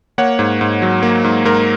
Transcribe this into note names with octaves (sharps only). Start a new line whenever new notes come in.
A#3 C#5 F#5
G#2
G#2
F#3
A#3
G#2
G#2 A#4